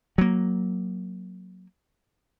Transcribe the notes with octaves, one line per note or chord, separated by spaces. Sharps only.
F#3 A#3